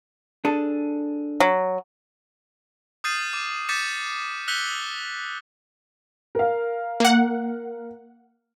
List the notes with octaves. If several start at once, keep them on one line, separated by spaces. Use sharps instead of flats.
D4 G#4 A4
F#3
D#6 F6 G6 A6 C7 D#7
D6
D6 G6 A6 B6 C#7 E7
E6 F#6 G6 B6 C#7 G7
A#4 F5
A#3 F#5